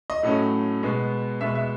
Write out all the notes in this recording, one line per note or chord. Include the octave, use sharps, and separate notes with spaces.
D#5
A2 F#3 A3 C#4
B2 G#3 B3
B2 G#3 B3 E5
E5